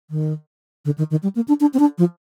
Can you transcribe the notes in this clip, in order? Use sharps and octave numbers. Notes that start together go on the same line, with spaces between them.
D#3
D3
D#3
D#3
G3
A#3
D4
D4
C4
D4
F3